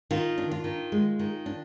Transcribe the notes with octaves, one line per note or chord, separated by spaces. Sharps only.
D#3 F4
D4
F4
D#3
G#3
D#3
D4